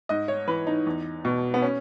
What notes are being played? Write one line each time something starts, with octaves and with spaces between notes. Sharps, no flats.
G#2 D#5
C#5
E3 B4
D#4
E2
B2
B3
C#4